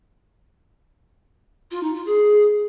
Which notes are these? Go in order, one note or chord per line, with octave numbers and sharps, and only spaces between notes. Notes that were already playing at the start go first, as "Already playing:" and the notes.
F4
D#4
F4
G#4